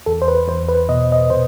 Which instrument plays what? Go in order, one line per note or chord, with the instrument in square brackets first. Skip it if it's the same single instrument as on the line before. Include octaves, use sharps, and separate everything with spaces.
[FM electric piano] E2 A4
C5
B4
E2 C5
B4
B2 D#5
D#5
B2 C5